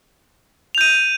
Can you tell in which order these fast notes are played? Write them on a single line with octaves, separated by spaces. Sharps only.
F7 G6 D#7